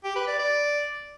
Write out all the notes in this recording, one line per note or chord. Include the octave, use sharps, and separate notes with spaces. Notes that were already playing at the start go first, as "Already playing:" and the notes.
G4
B4
D5
D5